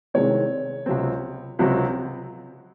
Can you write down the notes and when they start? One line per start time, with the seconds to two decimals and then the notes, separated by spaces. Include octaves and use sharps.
0.14 C2 C3 D#3 G#3 C4 C#5
0.86 C#2 C3 F#3 C4
1.59 C#2 C3 F#3 C4